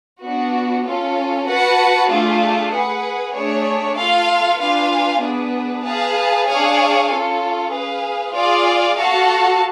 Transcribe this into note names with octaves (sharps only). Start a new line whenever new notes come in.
B3 D4 F#4
C#4 F4 A4
F#4 B4 F#5 A5
A3 D4 F4 G#4
G#4 B4 F#5
A3 D4 G#4 C#5
F4 A4 F5
D4 F4 B4 F5 G#5
B3 D4 G#4 B4
G#4 B4 F5 A5
D4 G#4 C#5 F5 G#5
C#4 F4 A4
G#4 B4 F5
F4 G#4 D5 F5
F#4 A4 F5 A5